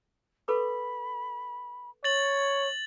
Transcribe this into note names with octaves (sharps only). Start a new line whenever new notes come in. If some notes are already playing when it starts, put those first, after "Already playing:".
A4 B4 B5 D6
C#5 A6 F#7